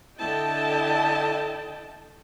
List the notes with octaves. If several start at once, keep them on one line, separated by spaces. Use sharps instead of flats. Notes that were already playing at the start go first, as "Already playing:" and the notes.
D3 E4 D#5 G5 A5